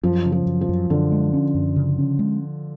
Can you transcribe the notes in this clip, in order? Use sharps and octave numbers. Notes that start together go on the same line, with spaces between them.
F#2 F3
C#3
F3
F#2
F3
F#2
F#2 D3
G#3
C#4
F#2
C#3
C#4
G#3